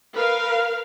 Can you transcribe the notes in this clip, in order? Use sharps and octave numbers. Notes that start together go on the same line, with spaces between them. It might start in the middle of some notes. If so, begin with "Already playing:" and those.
A#4 B4 F5